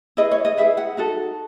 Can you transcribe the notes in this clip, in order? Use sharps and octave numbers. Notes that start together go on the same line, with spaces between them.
E4 G#4 B4 D#5
C#5
D#5
E4 G#4 B4 E5
F#5
D#4 F#4 A4